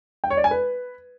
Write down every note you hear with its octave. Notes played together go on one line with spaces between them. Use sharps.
G5
C#5
D5
G#5
B4